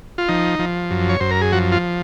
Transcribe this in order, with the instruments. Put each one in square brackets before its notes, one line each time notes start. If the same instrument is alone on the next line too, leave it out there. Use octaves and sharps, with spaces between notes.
[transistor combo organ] F4
F3 D#4
F3
F#2
C#5
F#2 C5
A#4
G#4
F3 F#4
F4